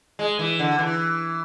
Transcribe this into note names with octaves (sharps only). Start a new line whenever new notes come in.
G#3
E3
D3
E3